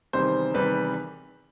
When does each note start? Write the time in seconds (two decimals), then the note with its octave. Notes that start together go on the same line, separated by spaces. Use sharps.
0.13 E2 C3 D#3 G3 C5
0.54 E2 C3 D#3 G3 B4